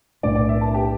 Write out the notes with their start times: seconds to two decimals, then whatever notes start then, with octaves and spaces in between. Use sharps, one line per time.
0.23 B1 A2 A3 D4 D5
0.35 D5
0.49 E5
0.61 A5
0.74 G4